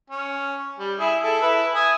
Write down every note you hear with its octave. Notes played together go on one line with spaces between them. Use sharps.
C#4
G3
E4 G#4
E4 A4
E4 B4
E5 G#5 D#6